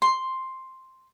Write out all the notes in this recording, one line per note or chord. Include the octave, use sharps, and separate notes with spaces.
C6